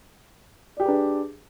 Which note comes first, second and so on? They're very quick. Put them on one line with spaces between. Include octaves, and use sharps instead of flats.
D5 G4 G#4 B4 D4